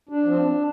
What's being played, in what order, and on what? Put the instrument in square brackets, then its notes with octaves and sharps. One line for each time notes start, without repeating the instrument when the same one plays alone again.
[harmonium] D4
F3 C4